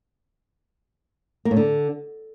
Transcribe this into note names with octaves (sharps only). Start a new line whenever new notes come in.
A#3
A2
D3